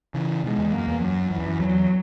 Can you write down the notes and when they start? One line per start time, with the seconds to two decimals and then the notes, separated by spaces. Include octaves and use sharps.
0.14 C#3 E3
0.44 B2 D#3 G#3
0.58 E2
0.72 F#2 A#3
0.88 E2
1.02 F#2 F#3
1.30 F#2 E3
1.38 E2
1.45 F#2
1.59 E2 F#3